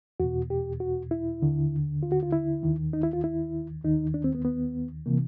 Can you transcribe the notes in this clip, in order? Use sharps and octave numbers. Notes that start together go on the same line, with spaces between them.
E2 B2 F#4
G4
F#4
E4
D#2 D3
F4
F#4
F4
E4
D#2 D#3
D#4
E4
F4
E4
D#2 D#3 D#4
D4
C4
B3
B3
C3 E3 A#3